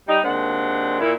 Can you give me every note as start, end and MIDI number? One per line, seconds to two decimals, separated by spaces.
0.08 0.19 55
0.08 0.19 63
0.24 1.01 39
0.24 1.01 46
0.24 1.01 56
0.24 1.01 60
0.24 1.01 62
0.24 1.01 78
1.01 1.13 46
1.01 1.13 64